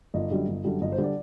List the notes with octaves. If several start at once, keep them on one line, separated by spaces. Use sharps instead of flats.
G1 D#5
F#2 D3 G3
G1
F#2 D3 G3
G1 D#5
C5
D3 G3
D5